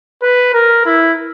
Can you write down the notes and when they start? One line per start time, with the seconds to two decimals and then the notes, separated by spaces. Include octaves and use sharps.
0.23 B4
0.54 A#4
0.86 E4